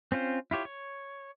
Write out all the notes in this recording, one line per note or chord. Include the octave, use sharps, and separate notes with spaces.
C4 C#4 F4 C5
E4 F4 G4 C#5
C#5